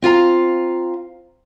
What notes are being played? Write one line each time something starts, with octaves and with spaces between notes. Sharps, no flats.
C4 F4 F5 A#5